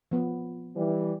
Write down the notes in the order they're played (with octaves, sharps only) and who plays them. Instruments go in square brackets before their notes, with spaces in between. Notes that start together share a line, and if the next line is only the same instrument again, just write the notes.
[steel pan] F3 B3
[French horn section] E3 G3